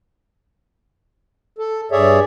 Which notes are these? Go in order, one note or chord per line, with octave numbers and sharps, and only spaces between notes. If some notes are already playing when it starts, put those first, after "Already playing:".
A4
G2 G#4 C#5 D5 E5